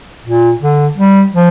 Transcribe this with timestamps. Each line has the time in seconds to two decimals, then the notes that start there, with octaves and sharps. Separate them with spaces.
0.26 A#2
0.62 D3
0.97 G3
1.33 F3